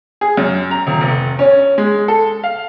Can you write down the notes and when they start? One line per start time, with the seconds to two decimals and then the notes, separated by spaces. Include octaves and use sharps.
0.21 G#4
0.37 F#2
0.71 A#5
0.87 D#1
1.01 F1
1.39 C#4
1.78 G#3
2.08 A4
2.44 F5